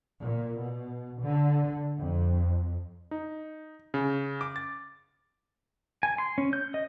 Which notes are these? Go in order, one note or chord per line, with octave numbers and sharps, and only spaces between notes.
A#2
B2
D3
F2
D#4
C#3
D6
A6
G#5
C6
C#4
G6
D#5